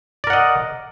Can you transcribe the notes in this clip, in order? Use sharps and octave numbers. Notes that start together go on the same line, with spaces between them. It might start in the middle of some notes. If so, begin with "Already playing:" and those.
A#4 D5 D#5 F#5